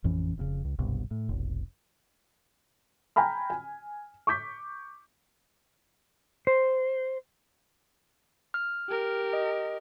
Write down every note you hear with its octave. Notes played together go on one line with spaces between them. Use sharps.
A1 F2 E3 C#4
F1 A2 C#3
C#2
F#1 C2 G2 B2
A2
F1 B1
G5 G#5 A#5 B5 F6
G#5
C#6 D6 G6 B6
C5
F6
G4 A#4
D#5